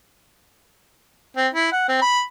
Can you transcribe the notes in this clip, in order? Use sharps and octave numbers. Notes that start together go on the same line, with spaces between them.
C4
E4
F#5
C4
B5